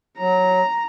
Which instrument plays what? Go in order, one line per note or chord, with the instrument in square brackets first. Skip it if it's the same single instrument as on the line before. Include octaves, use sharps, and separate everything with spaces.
[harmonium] F#3 [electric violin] A#5